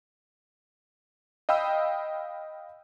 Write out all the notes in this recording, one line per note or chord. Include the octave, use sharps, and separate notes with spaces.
D#5 F5 G5 B5 E6